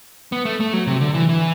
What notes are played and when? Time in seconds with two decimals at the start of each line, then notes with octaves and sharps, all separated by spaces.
0.32 B3
0.45 A3
0.60 A3
0.73 F#3
0.87 C3
1.01 D3
1.14 E3
1.29 E3